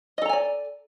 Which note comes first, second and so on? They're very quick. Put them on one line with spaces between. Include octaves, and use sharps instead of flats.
D#5 A4 A#5 G#5 D5